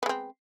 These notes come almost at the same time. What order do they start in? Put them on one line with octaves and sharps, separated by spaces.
B3 G#3 C4